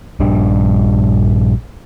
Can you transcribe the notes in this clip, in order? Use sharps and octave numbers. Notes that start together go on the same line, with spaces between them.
A#1 G2 G3 D4